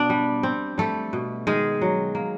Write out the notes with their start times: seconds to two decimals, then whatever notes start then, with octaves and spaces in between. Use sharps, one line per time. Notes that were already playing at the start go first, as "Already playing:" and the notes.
Already playing: B2 B3 D4 D5
0.10 G3
0.43 C4
0.78 G3 A3 A4
1.13 B2
1.47 D#3 G#3 G#4
1.81 F#3
2.15 A#3